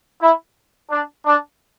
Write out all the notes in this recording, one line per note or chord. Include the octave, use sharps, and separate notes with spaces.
E4
D4
D4